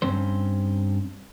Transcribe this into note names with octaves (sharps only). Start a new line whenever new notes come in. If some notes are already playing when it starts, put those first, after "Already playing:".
G2 C4 C#4 C5